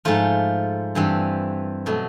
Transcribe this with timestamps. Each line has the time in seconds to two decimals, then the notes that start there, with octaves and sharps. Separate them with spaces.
0.05 G#2 F3 A3 F4
0.95 G2 E3 G3 C4
1.86 B2 F#3 A3